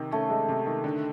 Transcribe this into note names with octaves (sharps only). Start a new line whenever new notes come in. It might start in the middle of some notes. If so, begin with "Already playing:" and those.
Already playing: C3 D#3
A3 C#4
G#3
C3
D#3
D3